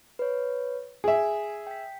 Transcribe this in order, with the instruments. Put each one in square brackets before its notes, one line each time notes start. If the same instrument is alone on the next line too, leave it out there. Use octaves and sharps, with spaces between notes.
[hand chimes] B4 C#5
[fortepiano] G#4 E5 [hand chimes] G#5
[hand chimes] G5 B6